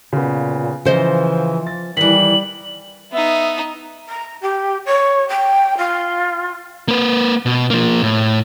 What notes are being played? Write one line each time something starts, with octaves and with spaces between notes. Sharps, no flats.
A#2 C#3 B3
C#3 E3 F3 C5 D#5
A6
D#3 E3 G3 B6 F#7
B3 D#4 E5
A#5
G4
C#5
G5
F4
A#3 B4
B2
F3 A#3
A2